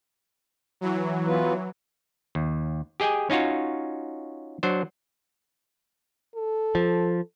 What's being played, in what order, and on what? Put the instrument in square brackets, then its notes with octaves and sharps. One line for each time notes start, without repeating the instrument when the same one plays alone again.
[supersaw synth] E3 F#3
[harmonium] B3 F4 B4
[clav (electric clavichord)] D#2
G4 G#4 D#5 G5 G#5
C#4 D#4 F4 F#4 C#5
F#3 D4 C5
[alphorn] A4
[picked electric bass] F3